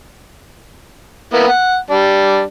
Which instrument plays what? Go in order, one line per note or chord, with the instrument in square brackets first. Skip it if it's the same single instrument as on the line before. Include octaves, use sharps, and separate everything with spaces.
[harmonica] A#3 B3 E4
F#5
G3 D4